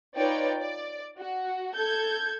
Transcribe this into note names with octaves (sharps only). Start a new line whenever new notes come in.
D#4 F4 B4 C#5 D5 G5
D5
F#4
A4 G6 G#6